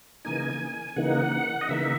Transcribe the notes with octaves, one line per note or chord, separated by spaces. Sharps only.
C#3 E3 A#3 D#4 G#5
C#3 E3 A#3 D#4 F#5
D#5
C#3 E3 A#3 D#4 E5